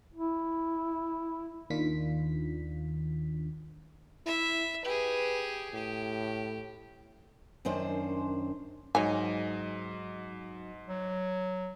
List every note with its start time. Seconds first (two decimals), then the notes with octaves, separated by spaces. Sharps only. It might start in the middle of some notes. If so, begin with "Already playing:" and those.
0.13 E4
1.70 D#2 D#3 D4 F4 B6
4.26 E4 E5
4.85 G4 G#4 B4
5.74 A2 G4
7.65 F#2 D#3 C#4 D4 C5
8.95 G#2 F#3 D#4 F#4 C#5 D#5 G#5
10.88 F#3